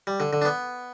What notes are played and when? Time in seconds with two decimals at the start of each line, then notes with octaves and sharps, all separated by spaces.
0.07 G3
0.20 D3
0.33 D3
0.42 D4
0.45 B3